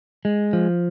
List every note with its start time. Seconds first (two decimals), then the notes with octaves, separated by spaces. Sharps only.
0.25 G#3
0.53 F3